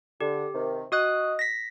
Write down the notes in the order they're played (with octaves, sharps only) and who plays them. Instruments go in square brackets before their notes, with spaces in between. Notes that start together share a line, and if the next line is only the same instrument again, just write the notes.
[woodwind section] D3 [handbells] G4
[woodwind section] C3 D#3
[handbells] F#4 D#6 F#6 [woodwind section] D#5
[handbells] A#6 B6